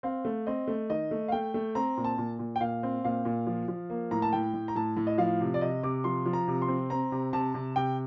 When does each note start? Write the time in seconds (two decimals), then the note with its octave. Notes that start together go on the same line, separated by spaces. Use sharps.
0.03 C4 F5
0.25 A3
0.47 C4 D#5
0.67 A3
0.90 D#3 D#5
1.11 A3
1.28 F5
1.32 A3 G5
1.54 A3
1.75 C4 A#5
1.97 A#2
2.04 A5
2.18 A#2
2.39 A#2
2.56 G5
2.61 A#2 F5
2.83 C4
3.04 A#2 F5
3.25 A#2
3.47 F3
3.68 F3
3.90 A#3
4.11 A2 A#5
4.22 A5
4.33 A2 G5
4.54 A2
4.68 A#5
4.75 A2 A5
4.97 A2
5.07 D#5
5.18 F3 F5
5.41 C3
5.54 D5
5.61 C3 D#5
5.83 C3 D6
6.04 F3 C6
6.26 F3
6.33 A#5
6.48 C3
6.62 C6
6.68 C4
6.90 C4 A#5
7.12 C3
7.33 C3 A5
7.54 C3
7.76 C3 G5